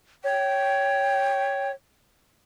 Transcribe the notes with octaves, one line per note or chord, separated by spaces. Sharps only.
C#5 G5